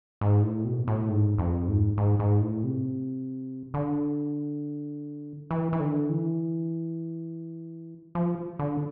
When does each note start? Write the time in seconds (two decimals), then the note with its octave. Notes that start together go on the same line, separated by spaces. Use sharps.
0.21 G#2
0.43 A2
0.65 B2
0.88 A2
1.09 G#2
1.38 F2
1.68 G#2
1.98 G#2
2.19 G#2
2.41 A2
2.64 C3
3.74 D3
5.51 E3
5.73 E3
5.80 D3
6.09 E3
8.15 F3
8.59 D3